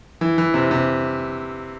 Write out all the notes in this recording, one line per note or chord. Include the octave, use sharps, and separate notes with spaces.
E3
E3
C3
C3